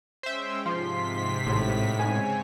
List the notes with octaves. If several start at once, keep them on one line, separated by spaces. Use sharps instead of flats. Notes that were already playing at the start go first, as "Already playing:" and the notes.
G#3 C#4 C5 E5 G5
G#2 C3 F3 C6 B6
A1 A2
G#2 C#3 C4 C#5 G#5